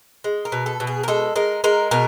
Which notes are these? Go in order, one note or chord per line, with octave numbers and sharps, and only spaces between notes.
G#3
A#4
B2
A4
B2
G#4
A#4
G#3 A4
G#3 A#4
G#3 A#4
B2 A#4